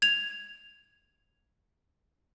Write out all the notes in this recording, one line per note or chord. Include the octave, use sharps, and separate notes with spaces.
G#6 F7